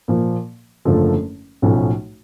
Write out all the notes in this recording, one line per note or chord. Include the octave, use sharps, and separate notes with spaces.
A#2 F3 A#3
F#1 F#2 D3 F3 A3
B1 A2 F3 A3 C#4